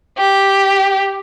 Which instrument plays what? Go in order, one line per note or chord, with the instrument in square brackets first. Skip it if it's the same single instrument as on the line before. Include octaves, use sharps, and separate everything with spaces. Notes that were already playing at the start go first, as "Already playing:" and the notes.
[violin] G4